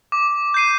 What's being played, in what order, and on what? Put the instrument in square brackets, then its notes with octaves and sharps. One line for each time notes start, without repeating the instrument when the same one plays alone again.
[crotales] D6
G6 C7 D#7